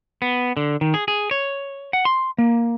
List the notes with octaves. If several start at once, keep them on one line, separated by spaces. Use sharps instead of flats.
B3
D3
D#3
G#4
G#4
C#5
F#5
C6
A#3